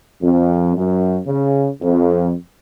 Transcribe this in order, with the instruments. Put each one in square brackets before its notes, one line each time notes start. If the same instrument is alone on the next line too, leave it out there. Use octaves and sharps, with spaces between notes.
[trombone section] F2
F#2
C#3
F2